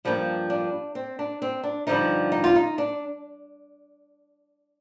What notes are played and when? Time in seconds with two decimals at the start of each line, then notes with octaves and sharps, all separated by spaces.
0.05 G2 F3 A#3 D4
0.50 D4
0.95 C4
1.19 D4
1.42 C4
1.63 D4
1.87 G2 D3 F3 D#4
2.32 D#4
2.44 F4
2.56 D#4
2.78 D4